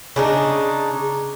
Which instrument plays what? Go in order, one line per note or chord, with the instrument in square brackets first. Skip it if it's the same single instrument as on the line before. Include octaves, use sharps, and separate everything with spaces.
[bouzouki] C#3 D4 D#4